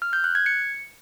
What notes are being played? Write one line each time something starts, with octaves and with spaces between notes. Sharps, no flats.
F6
G6
F#6
G#6
C#7